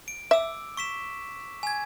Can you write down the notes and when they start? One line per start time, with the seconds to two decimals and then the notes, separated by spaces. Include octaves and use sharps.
0.08 D7
0.31 E5 D6 E6
0.77 C#6 B6 E7
1.63 G#5 G#6